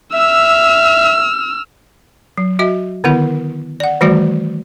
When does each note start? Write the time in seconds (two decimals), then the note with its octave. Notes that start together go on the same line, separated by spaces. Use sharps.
0.14 E5 E6 F6
2.38 F#3
2.59 F#4 D#5 E5
3.04 D3 D#3 B3 E4 A#4
3.80 D5 F#5
4.01 D#3 E3 G3 A3 F#4 D5